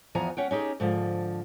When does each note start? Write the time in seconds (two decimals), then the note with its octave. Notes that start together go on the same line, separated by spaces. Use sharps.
0.15 E2 E3 F3 F#5 G#5 A#5
0.37 C#4 F#5 G5
0.51 C#4 D#4 G4 G#4
0.80 G#2 D3 F3